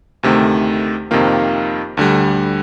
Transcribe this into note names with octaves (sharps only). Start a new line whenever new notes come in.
D2 C3 D#3 A3
F2 C3 D#3 A#3 F4
D2 D3 G3